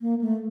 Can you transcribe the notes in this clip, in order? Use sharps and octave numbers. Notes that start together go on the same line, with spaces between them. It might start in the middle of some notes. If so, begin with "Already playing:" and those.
A#3
A3